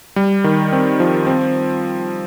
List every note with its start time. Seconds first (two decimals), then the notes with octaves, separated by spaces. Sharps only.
0.16 G3
0.44 D#3
0.72 C4
1.00 F3
1.27 C4